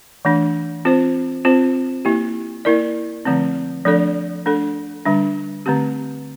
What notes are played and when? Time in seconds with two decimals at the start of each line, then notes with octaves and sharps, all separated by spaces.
0.25 E3 A3 D4
0.85 C4 F4 C5
1.45 C4 F4 C5
2.05 A#3 E4 G4
2.65 A#3 E4 A#4 D5
3.25 D3 F3 A3 C4
3.86 F3 A3 D4 A4 D5
4.46 A3 D4 A4
5.05 D3 G3 D4
5.66 D3 A3 C4 G4